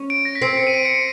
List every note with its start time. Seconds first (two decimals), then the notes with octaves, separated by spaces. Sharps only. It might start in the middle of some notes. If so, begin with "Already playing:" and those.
Already playing: C#4
0.10 D7
0.25 A#6
0.35 B6
0.42 C4 C7
0.57 C#7
0.67 D#7
0.74 D7
0.85 C#7
0.90 D7